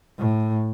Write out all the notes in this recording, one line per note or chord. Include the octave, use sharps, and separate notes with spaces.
A2